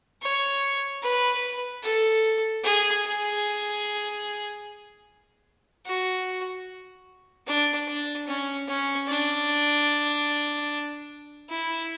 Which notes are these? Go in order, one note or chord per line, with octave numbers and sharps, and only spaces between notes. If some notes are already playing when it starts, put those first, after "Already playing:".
C#5
B4
A4
G#4
G#4
F#4
D4
D4
C#4
C#4
D4
E4